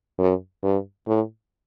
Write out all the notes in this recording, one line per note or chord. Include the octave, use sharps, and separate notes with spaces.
F#2
G2
A2